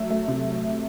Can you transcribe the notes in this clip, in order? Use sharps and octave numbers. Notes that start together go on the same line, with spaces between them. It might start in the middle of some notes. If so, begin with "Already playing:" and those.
Already playing: F#3 A3 E5
A3
C3